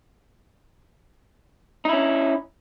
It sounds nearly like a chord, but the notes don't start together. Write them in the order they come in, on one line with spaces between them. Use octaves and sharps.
D#4 E4 C#4